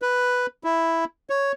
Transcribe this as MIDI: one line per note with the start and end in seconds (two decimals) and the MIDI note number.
0.02 0.46 71
0.64 1.05 64
1.30 1.52 73